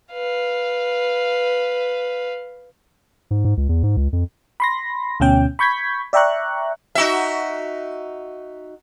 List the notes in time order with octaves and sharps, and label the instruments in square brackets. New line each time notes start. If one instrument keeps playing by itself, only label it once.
[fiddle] B4 F5
[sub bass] G#2
G#2
C#2
E2
G#2
C#2
F2
[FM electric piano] B5 C6 A#6
D2 B2 C#4 G5
B5 C#6 G6 G#6 B6
D5 E5 G5 A#5 C#6 F#6
[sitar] D#4 F#4 E5